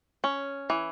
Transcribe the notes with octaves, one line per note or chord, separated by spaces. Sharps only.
C#4
E3